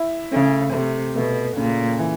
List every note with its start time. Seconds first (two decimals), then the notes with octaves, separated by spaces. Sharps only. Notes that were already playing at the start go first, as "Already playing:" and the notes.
Already playing: E4
0.33 C#3 A3
0.74 C3 A3
1.16 B2 A3
1.57 A#2 C#3
1.99 E3